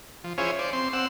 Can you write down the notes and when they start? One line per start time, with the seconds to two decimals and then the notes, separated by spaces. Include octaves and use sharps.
0.24 F3
0.38 C#4 E4 F4 G#4 C5 C#5
0.59 C5 D5
0.73 C4 C6
0.93 C4 F#5 E6